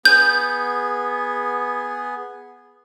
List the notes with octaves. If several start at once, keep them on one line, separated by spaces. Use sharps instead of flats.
B3 G#4 G6